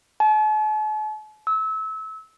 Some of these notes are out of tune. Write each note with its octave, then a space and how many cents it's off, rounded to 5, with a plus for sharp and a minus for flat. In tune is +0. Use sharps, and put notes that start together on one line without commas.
A5 -45
E6 -30